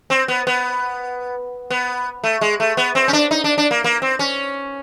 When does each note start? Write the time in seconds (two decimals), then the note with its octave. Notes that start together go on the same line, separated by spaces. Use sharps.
0.10 C4
0.28 B3
0.47 B3
1.70 B3
2.24 A3
2.41 G#3
2.60 A3
2.77 B3
2.95 C4
3.08 C#4
3.13 D4
3.31 D#4
3.44 D4
3.58 D4
3.71 A#3
3.84 A#3
4.02 C4
4.19 C#4